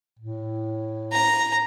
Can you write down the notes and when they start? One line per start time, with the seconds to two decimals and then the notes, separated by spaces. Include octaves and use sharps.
0.19 A2
1.13 A#5